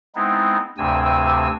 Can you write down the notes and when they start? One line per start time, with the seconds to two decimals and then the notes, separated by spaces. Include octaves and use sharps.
0.15 G#3 B3 C4 D#4 E4
0.78 D2 G2 C3 C4 G#5 E6